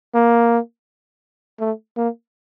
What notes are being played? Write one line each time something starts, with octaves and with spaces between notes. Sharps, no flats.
A#3
A3
A#3